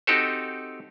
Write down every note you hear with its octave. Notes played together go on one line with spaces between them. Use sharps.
C4 D#4 F#4 G4 A4 C5